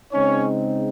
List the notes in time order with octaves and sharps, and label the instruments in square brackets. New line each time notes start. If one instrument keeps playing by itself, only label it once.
[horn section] C#3 G#3 C4 C#4 D#4 C#5